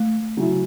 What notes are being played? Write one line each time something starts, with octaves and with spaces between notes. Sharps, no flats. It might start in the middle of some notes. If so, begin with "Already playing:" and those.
Already playing: A3
C#3 F#3 C#4 E4